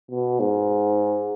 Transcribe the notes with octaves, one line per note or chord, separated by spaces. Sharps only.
B2
G#2